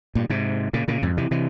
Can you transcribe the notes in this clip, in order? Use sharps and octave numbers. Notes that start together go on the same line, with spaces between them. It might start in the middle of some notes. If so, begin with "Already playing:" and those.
G2 A#2
G#2 C3
A#2 C#3
A#2 C#3
F2 G#2
C3 E3
C3 E3